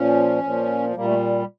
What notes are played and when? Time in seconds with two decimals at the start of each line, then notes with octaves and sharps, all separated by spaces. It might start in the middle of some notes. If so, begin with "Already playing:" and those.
Already playing: A#2 F3 C#4
0.43 A#2 F3
0.95 A#2 G3 A#3
1.05 A3